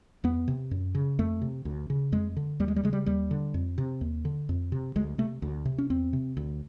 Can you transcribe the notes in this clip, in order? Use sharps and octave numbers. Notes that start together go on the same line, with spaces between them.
E2 B3
C3
F#2
C#3
F2 A3
C3
D2
C#3
F2 G#3
D3
D#2 G3
G#3
G3
C#3 G#3
G3
D#2 G3
D3
F2
C3
D#2
D3
F2
C3
D2 G#3
C3 A3
D2
C3
C#4
E2 C4
C3
D2